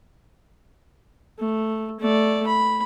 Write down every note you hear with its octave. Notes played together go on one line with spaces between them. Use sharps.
A3
A3 D5
B5